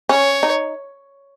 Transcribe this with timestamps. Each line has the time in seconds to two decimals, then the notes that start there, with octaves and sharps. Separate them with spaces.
0.09 C#4 C#5
0.43 D#4